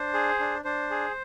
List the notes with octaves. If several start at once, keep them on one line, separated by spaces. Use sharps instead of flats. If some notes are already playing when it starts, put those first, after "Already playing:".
Already playing: D4 C5
G#4
D4
D4 C5
G#4